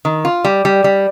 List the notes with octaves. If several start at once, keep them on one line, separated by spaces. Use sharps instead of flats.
D#3
F4
G3
G3
G3